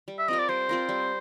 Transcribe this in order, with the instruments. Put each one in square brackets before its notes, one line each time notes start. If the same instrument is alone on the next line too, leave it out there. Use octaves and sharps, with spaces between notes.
[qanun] G3
[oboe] E5
[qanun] C4 F4 A#4 [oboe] D#5
[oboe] D5
[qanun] G3 [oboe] C5
[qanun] C4 F4 A#4
G3